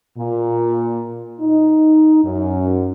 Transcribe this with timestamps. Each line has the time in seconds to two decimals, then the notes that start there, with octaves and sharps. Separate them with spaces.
0.17 A#2
1.40 D#4
2.23 F#2